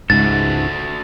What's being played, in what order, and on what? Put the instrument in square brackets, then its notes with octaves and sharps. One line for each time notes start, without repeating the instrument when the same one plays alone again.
[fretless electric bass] C#2 G#2 [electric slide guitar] A3 F#4 A4 [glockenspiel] A6